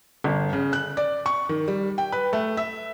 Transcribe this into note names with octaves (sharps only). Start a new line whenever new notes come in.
G1
C#3
F#6
D5
C#6
D#3
G3
G5
B4
A3
E5